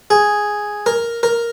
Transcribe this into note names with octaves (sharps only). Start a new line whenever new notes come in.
G#4
A#4
A#4